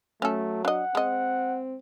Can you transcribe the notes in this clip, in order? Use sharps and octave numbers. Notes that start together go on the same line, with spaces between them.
F#3 A3 C#4 A4
D4 D#5 F#5
G#3 C4 D#5